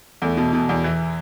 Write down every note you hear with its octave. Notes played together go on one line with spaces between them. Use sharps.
E2 A3
B2
B2
E2
E3